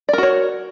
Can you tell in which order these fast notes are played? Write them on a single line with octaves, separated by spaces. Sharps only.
D5 A#4 F#4 C#5